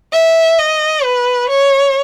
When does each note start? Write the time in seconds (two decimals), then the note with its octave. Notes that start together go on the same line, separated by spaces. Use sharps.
0.13 E5
0.59 D#5
1.04 B4
1.50 C#5